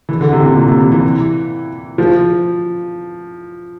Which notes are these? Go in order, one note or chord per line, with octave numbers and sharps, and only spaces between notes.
E3
D3
C3
A#2
A#2
C3
E3
E3
F3